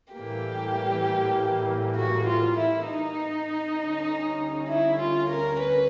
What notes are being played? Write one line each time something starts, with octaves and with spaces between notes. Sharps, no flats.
A2 E3 G3 A#3 G4
F#4
F4
E4
D#4
D2 D3 G3 A#3 C#4
E4
F4
A#4
B4